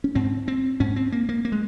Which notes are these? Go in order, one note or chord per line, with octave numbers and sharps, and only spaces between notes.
C#4
G#2 C4
C4
G#2 C#4
C4
A#3
A#3
A#3
G#3